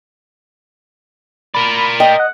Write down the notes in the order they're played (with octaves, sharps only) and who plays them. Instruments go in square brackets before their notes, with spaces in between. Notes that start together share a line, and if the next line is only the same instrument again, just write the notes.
[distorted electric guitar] A#4 D5 [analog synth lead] B5
[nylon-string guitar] D#5 [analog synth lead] G5
[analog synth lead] F#5